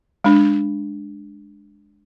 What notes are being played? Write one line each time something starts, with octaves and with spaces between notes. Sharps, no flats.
G#3 D4